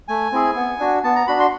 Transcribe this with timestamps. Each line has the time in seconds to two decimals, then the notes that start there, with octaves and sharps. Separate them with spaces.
0.08 A3 G#5
0.32 C4 E4 G#4
0.56 B3
0.80 D4 F#4
1.04 B3 A5
1.16 A#5
1.27 D4 F#4 B5
1.40 C6